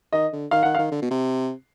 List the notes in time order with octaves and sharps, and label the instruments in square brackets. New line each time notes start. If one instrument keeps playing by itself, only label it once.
[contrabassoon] D#3 [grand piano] D#5
[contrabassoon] D3
[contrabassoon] D#3 [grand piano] F5
[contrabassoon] D#3 [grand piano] F#5
[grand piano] F5
[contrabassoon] D#3
D3
B2
C3